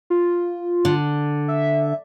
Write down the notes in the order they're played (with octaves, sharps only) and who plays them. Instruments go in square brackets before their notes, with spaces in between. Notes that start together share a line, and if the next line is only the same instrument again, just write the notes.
[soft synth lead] F4
[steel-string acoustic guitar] D3
[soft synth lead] E5